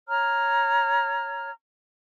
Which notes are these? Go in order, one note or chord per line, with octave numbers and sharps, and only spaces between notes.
C#5 A#5 F6